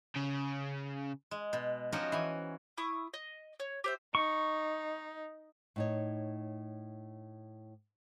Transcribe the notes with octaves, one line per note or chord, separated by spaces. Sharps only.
C#3
G#3
B2
F3 C#4 D#4 F#4 G4 D#5
E3 G#5
E4 C#6 D#6
D#5
C#5
G4 C5 E5
D#4 C#6
A2 D#4 C#5